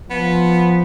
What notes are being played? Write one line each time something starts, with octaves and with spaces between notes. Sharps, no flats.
F3 B3